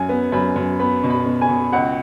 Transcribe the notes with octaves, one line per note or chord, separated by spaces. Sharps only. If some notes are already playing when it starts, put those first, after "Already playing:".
Already playing: F#2 G#5
B3
F#2 B5
F#2
B3 B5
B2
B5
B2
G#5
B2
C#2 F#5